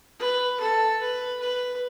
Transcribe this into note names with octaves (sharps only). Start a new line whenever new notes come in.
B4
A4
B4
B4